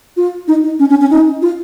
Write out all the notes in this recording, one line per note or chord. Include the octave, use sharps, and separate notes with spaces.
F4
D#4
D#4
C#4
C#4
C#4
D#4
F4